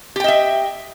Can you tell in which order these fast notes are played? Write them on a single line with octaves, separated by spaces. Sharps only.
G4 G5 D#5 E5